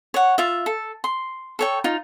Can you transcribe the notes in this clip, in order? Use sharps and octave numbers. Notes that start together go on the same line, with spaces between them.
C#5 F#5
F4 E5
A4
C6
A4 C#5 G5
D#4 F4